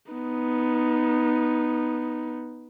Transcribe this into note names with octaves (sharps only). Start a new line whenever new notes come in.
B3 D#4